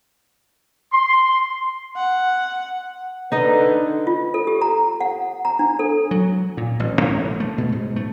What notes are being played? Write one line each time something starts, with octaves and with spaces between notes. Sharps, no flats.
C6
F#5
D3 D#4 B4 D#5
F4
A4
G4
A#5
F#5
A#5
D4
A4
F#3
A#2
A1
A2
A3
B2
G#2
A3